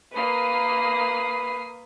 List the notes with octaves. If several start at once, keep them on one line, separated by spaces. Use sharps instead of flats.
A#3 B4 D#6 C7